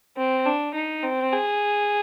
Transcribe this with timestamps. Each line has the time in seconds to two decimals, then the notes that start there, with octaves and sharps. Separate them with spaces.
0.17 C4
0.46 D4
0.74 D#4
1.03 C4
1.32 G#4